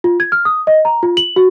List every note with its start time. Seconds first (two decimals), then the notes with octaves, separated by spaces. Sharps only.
0.04 F4
0.20 G#6
0.32 F6
0.45 D#6
0.67 D#5
0.85 A#5
1.03 F4
1.17 F#7
1.36 F#4